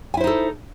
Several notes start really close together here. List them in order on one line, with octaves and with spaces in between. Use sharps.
G#5 E4 C5 D#4 A4